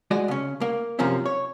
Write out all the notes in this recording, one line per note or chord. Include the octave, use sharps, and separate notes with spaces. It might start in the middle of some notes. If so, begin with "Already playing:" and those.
G#3 F#4 D5 D#5
C#3 C#4
A#3
F#2 C3 F3 A#3 C4 C#4
C#5